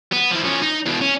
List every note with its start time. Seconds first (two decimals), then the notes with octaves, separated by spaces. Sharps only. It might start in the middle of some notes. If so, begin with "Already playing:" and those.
0.13 B3
0.31 F3 E4
0.45 F3 C#4
0.63 D#4
0.86 E2 B2
1.01 C#4